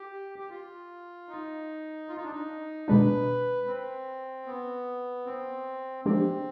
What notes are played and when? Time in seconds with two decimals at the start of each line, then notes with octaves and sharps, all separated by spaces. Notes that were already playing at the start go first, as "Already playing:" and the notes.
Already playing: G4
0.39 G4
0.50 F4
1.29 D#4
2.09 F4
2.17 D#4
2.24 D4
2.32 D#4
2.88 B2 G#3 D4 B4
3.67 C4
4.46 B3
5.26 C4
6.05 F3 G#3 C4 D4 G4